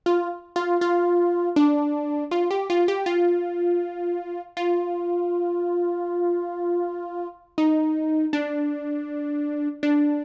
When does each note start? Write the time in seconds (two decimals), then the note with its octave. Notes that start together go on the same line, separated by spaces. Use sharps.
0.06 F4
0.56 F4
0.81 F4
1.56 D4
2.31 F4
2.51 G4
2.70 F4
2.88 G4
3.06 F4
4.57 F4
7.58 D#4
8.33 D4
9.83 D4